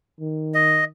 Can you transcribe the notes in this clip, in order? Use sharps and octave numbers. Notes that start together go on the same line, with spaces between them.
D#3
D#5